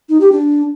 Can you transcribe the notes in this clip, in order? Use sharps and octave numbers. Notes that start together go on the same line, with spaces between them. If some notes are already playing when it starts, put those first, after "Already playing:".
D#4
G4
D4